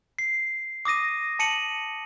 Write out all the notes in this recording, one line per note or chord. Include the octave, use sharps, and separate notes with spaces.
C7
D6 D#6 A#6 D#7
A5 C#7 D#7 F#7